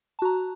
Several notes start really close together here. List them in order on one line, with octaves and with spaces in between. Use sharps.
A5 F#4 A#5